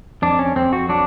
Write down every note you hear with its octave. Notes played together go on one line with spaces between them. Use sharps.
F2 D4
C#4
F2 C4
F#4
F#3 D4